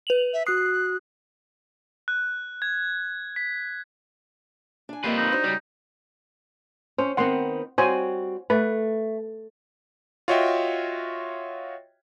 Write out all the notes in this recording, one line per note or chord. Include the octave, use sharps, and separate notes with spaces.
B4 F7 F#7
E5
F#4 D#6 F#6 C7
F#6
G#6
B6
D4 G#5
G3 A#3 C4 F4 B4 D#5
D#4
D4 F#4 C5
C#3 G3 F#4
C#4 C5
D#3 B3 C4 F#5 C6
G3 C4 F#4 C5 C#5 G#5
A3 B4
F4 F#4 C#5 D#5 E5 G5